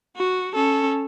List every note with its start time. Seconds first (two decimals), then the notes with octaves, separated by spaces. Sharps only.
0.17 F#4
0.55 C#4 A4